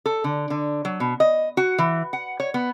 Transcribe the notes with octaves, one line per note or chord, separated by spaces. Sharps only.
A4
D3
D3
F#3
B2
D#5
F#4
E3
F#5
C#5
B3